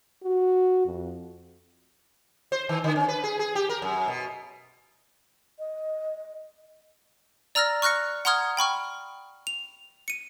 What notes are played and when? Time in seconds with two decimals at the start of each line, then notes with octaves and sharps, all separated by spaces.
0.23 F#4
0.86 F2
2.52 C5
2.69 D#3
2.84 D3
2.96 C#4
3.08 B4
3.24 G#4
3.39 G#4
3.55 G4
3.69 A#4
3.82 F#2
4.08 B2
5.59 D#5
7.55 D5 A#5 E6 F6 A6 A#6
7.82 C#6 F6 F#6 A#6 C#7
8.25 F#5 A#5 C6 D#6 F6 G#6
8.57 G5 B5 C#6 F6
9.47 F7
10.08 C#7 D#7